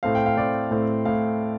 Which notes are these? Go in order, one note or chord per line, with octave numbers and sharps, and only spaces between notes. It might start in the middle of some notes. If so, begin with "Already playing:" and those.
A2 A3 C4 F5
G5
F5
A2 A3 C4 D5
A2 A3 C4
A2 F5